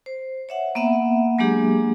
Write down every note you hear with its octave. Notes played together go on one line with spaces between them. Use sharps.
C5
C#5 E5 F#5
A#3 B3 E5 F#5
F#3 G#3 A#3 D4 G4 G#4